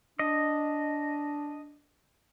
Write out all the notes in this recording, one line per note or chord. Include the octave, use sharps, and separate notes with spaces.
D4 D#5